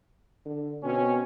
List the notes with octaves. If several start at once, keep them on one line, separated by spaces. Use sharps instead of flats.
D3
B2 C4 C#4